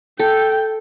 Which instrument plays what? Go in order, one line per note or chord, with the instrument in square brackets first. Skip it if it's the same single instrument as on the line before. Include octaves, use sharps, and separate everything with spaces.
[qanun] A4 [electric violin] G5